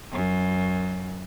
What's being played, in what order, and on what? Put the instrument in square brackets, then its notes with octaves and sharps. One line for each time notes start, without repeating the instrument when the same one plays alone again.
[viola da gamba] F#2